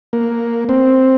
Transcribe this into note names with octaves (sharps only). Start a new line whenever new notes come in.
A#3
C4